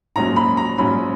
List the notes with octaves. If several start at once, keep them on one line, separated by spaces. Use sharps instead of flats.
A#1 G#2 F#3 C#4 A#5
B5
A#5
A#1 G#2 F#3 C#4 B5